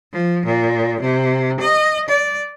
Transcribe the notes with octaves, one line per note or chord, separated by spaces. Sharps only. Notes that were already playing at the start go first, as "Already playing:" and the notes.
F3
A#2
C3
D#5
D5